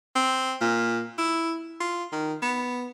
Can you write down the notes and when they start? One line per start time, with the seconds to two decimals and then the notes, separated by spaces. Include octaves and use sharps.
0.15 C4
0.61 A#2
1.18 E4
1.80 F4
2.12 D#3
2.42 B3